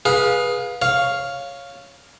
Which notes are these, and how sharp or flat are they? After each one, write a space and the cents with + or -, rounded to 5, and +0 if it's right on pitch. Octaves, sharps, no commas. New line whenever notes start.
G#4 +0 B4 -15 F5 +20
C#5 +0 F5 +0